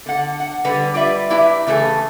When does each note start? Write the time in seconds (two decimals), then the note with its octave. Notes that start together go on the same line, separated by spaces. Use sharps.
0.06 D3 F#5
0.40 F#5
0.65 D3 G3 B4 F#5
0.94 G3 F4 B4 D5 E5
1.30 E4 G4 B4 E5 A#5
1.67 C#3 E3 A3 G#4 A4